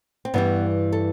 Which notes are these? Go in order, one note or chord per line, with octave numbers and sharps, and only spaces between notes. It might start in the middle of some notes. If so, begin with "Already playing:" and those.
C4
G2 E3 G3 B3
A4